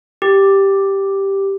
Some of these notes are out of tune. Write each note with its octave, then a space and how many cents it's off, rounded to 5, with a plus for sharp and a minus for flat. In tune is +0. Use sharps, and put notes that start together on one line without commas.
G4 +0